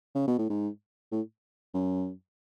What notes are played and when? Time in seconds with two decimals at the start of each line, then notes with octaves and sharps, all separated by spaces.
0.15 C#3
0.28 B2
0.39 A2
0.50 G#2
1.12 A2
1.74 F#2